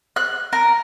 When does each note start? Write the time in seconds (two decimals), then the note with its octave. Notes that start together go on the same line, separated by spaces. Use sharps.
0.16 F#6
0.53 A#4